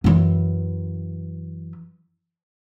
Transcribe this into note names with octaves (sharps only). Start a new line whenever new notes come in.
F#2 E3